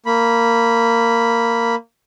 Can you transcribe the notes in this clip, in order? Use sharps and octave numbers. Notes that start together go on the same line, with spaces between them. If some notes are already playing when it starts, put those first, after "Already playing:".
A#3 B5